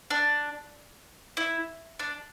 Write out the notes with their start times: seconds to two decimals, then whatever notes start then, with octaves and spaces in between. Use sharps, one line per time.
0.10 D4
1.37 E4
1.99 D4